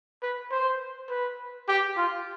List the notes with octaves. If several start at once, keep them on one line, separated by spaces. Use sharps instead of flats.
B4
C5
B4
G4
F4